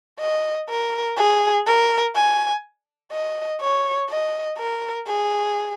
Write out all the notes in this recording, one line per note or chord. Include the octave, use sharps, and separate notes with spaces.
D#5
A#4
G#4
A#4
G#5
D#5
C#5
D#5
A#4
G#4